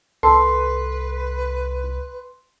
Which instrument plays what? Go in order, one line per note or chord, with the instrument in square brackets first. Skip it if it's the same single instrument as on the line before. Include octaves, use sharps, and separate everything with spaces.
[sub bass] C2 [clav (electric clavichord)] A4 [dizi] B4 [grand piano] C6